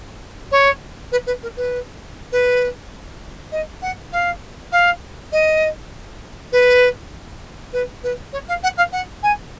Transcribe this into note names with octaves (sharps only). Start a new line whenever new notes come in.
C#5
B4
B4
A#4
B4
B4
D#5
F#5
F5
F5
D#5
B4
B4
B4
C#5
F5
F#5
F5
F#5
G#5